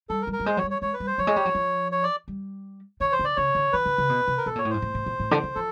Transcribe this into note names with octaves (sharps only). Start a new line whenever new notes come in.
G3 A4
A#4
G3
A#4
G3
G#3 C5
F#3 C#5
G3
C#5
G#3 C#5
B4
G3
C5
F#3 C#5
G#3
G3
F#3
F3
C#5
D5
G3
D#3 C#5
C5
D3
D5
C#3 C#5
D3
D#3 B4
D3
C#3
B2
C3
A#4
B2 A4
A#2 C#5
A2
G#2 C5
A2
A2
A#2
A2
D3
D#3
F3 A4